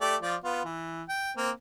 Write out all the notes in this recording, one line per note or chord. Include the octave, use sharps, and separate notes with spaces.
A3 G4 D5
F3 F4 D5
B3 F4
E3
G5
A#3 C4